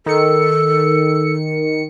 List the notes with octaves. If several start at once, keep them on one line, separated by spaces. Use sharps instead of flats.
D#3 A4 C#7